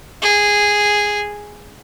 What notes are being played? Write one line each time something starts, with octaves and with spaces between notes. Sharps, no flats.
G#4